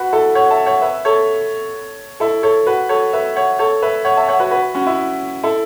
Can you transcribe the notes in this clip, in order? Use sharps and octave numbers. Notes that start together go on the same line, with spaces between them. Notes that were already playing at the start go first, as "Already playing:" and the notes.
Already playing: F#4 B4
E4 A4
C#5 F#5
E5 A5
C#5 F#5
B4 E5
A4 C#5
E4 A4
A4 C#5
F#4 B4
A4 C#5
B4 E5
C#5 F#5
A4 C#5
B4 E5
C#5 F#5
E5 A5
C#5 F#5
F#4 B4
F#4 B4
C#4 F#4
E4
E4 A4